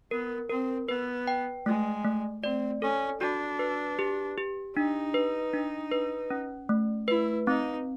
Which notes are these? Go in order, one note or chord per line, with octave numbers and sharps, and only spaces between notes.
B3 A#4
C4 A#4
B3 B4
G5
G#3 A3
A3
C4 D5
C#4 A4
D4 F#4
B4
G4
G4
D4 D#4
B4
D4
B4
C#4
A3
E4 B4
C4 D#4